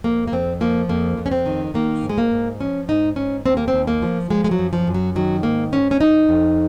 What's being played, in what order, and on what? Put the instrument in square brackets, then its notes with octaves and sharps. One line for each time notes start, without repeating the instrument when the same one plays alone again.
[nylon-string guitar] F2 A#3
A#3
F2 C4
F3 A#3
F2 A#3
F2
C#4
C4
D#3
D#3 A#3
G#2
G#3
A#3
G#2
F3 C#4
G#2 D#4
G#2 C#4
D#2 C4
A#3
C4
D#2
A#3
F3
F3 G#3
G#3
F#3
F#2
F3
F#2
F#3
D#3 F#3
G#2 A#3
G#2 C#4
C#4
F2 D#4
F2